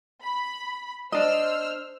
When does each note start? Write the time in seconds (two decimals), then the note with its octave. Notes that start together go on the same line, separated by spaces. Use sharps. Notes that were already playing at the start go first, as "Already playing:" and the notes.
0.22 B5
1.12 D4 C5 D#5 E6 F6